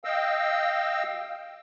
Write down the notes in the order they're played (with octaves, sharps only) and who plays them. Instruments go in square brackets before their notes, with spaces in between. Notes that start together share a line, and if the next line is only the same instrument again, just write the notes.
[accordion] D#5 F5 G5 E6